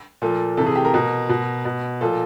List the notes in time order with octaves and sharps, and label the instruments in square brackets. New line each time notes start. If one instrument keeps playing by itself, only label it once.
[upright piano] A#2 F3 A4
C3 E3 A4
G#4
G4
A#4
B2
B2
B2
A#2 F3 A4